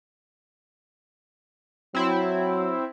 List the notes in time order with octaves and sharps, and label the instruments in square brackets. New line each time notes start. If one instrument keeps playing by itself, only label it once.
[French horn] F#3 [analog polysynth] C4 E4